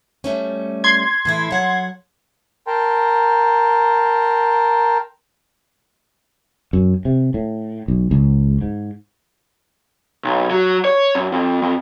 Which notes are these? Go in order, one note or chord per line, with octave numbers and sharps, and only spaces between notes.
G3 A3 C#4
C6 G#6
A2 E3 E4
F#3 F#5
A#4 G5 A5 A#5 C6
F#2
C3
A2
B1
C#2
G#2
B1
F#3
C#5
F#2
F2
F2